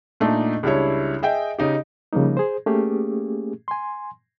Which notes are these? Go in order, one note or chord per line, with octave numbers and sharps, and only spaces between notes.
A#2 A3 D4 D#4
C#2 G3 D4 E4 C#5
G#4 D#5 E5 G5
C#3 D#4 G4
C#3 F3 G3 A#3 D#4
G#4 C5
A3 A#3 C#4 G4 G#4
G#5 C6